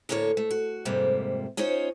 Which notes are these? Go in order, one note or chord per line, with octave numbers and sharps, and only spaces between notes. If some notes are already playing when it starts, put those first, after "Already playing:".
D2 A2 D3 A#3 C5 C#5
A3
F#4
F2 G#2 C3 G3 A#3
C#4 D#4 F4 C5 C#5